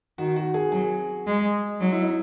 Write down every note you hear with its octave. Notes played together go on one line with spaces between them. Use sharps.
D#3 F#4
F#4
G#4
F#3 G#4
G#3
F#3 D#4
E4
D#4